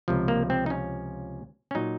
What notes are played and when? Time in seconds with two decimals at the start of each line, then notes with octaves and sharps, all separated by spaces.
0.08 C#2 C3 F3
0.28 A#3
0.50 C4
0.66 D#4
0.70 C#4
1.71 C#4
1.75 A#2 F#3 D#4